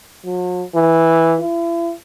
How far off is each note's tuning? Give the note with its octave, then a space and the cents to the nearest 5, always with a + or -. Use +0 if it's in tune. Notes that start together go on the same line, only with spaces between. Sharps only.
F#3 -45
E3 -5
E4 +40